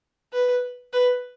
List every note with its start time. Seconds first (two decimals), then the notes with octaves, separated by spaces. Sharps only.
0.33 B4
0.93 B4